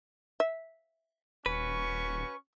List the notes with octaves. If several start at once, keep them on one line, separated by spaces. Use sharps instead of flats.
E5
D#1 C#4 F#4 B4 C#6